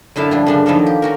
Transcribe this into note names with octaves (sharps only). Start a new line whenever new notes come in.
F#2 D3 E4 F5 A5
F3 G3 D4
F#2 C#3 D4
D#3 F3 A#3 B3 A4 A#4
G4
C#4 F#4 A#4